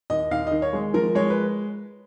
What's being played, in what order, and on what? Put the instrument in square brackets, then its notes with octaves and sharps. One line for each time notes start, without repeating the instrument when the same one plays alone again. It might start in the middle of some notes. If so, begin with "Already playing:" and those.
[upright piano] D#2 D#5
D#2 F5
D#3 D#5
C#5
G#3
F3 A#4
G#3 C#5
B4